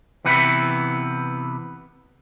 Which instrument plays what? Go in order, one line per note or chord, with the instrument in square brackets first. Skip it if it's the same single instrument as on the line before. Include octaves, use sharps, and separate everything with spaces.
[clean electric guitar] C3 E3 B3 E4